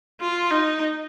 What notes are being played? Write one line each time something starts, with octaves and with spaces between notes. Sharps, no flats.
F4
D#4